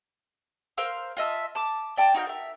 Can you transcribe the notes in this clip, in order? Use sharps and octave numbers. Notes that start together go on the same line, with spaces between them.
A#4 C5 F5 E6
F4 D#5 E5 A5
A5 D6
D5 G5 A5
D#4 F#4 F5 G5
A#4 E5